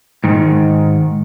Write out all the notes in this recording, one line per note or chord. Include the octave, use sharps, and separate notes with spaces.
G#2 D#3